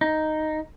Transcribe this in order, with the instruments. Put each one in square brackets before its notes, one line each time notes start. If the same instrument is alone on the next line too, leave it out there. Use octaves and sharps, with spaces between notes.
[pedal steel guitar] D#4